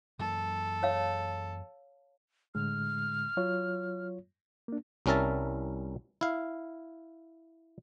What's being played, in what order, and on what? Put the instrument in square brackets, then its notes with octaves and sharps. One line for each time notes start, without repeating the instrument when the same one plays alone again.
[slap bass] F#2 E3 A#3 [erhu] A4
[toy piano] C#5 F5
[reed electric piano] A2 D3 G#3 [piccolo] F6
[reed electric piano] F#3 F4 C#5
A#3 D4
[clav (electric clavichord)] C2 G3 C#4 A#4 E5 A5
E4 F5